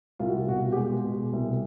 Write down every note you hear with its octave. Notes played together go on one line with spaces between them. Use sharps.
C2 F4
F#4
F4
B2 F#4
G4
G#3 G#4
B2
C2